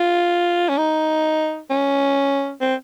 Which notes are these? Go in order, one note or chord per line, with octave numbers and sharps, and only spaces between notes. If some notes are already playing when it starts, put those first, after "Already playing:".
Already playing: F4
C#4
D#4
C#4
C4